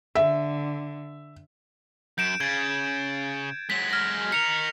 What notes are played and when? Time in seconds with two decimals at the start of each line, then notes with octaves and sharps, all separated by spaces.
0.15 D3 E5
2.18 F#2 G6 D7 E7
2.40 C#3 G#6 A6
3.70 F#3 G#3 B6
3.91 F6 A#6
4.32 D#4 A#4 C#7 F7